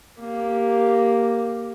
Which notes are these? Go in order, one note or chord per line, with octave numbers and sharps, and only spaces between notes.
A#3 G4